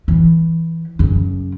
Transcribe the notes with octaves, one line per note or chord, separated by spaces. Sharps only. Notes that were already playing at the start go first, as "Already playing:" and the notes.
E3
F#2 C#3